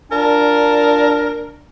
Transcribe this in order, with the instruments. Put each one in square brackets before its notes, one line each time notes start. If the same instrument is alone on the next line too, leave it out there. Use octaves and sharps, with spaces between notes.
[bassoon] A#2 [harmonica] A#3 A5 [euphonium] D4 [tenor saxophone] A#4